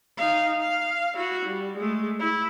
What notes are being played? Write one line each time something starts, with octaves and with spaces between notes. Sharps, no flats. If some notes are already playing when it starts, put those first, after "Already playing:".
D#4 F5
F5
E4 F#4
G3
G#3 A3
E4